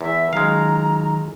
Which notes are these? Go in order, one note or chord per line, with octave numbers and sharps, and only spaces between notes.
E2 E5
D#3 F#3 G#3 F5 A#5